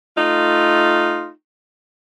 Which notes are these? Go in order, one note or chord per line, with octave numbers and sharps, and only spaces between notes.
A3 D#4 F4